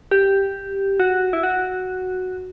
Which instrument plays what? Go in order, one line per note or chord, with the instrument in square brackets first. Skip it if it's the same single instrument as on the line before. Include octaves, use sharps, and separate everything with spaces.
[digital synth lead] G4
F#4
E4
F#4